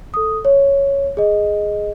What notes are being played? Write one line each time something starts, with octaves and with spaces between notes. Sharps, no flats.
A4 D#6
C#5
G#4 D#5